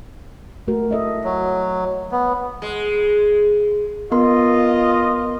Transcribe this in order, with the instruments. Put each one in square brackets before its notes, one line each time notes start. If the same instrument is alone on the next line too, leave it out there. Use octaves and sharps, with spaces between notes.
[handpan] A3 F#4 A#4
A4 D#5 E5
[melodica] F#3
B3
[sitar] G#3
[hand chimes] B3 A#4 C6 [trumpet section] F4 D#5